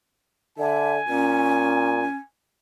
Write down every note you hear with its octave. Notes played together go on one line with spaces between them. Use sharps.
D3 E5 G#5
A#2 C#4